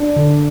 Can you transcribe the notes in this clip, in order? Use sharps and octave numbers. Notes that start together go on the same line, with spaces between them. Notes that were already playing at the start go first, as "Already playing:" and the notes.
Already playing: D4
D3